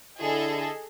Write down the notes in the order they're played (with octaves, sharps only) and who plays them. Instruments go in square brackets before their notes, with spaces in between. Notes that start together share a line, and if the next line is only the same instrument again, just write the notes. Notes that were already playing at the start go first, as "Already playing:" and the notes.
[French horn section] D3 E4 [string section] G#4 A4 D#5